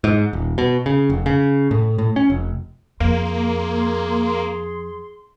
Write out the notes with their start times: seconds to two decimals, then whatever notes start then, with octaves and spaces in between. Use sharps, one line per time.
0.04 G#2
0.33 D#1
0.58 B2
0.86 C#3
1.10 F1
1.26 C#3
1.71 A2
1.98 A2
2.16 C#4
2.30 F1
3.00 F2 A#3 G#4 C6